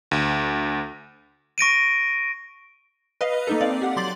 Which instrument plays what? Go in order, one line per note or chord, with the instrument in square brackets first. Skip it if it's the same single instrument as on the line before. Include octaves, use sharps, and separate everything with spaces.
[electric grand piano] D2
[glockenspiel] C#6 A#6 D7 D#7
[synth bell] B4 D#5 F5
A#3 D#4 A4
C4 D5 F5
G4 F#5
F#3 C6 D6 A6 F#7